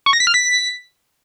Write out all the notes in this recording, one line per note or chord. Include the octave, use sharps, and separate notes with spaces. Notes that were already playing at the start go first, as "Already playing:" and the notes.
C#6
A#6
B6
F6
B6